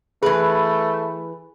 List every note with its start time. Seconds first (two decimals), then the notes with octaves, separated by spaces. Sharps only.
0.23 E3 A3 G#4 B4